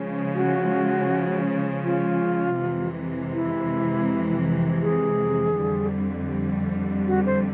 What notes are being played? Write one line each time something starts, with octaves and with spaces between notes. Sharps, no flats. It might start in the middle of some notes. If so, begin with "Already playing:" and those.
Already playing: C#3 F3 G#3
F#4
F4
F2 C3 E3 G#3
E4
G#4
F2 D3 G3
F#4
C5